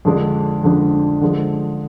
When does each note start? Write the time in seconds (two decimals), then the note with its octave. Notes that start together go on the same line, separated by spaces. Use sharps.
0.05 F2 D3 F3 G#3 D4
0.64 F2 D3 F3 G#3 D4
1.21 D3 F3 G#3 D4